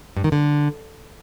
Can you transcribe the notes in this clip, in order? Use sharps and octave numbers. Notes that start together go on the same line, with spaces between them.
G2
D#3
D3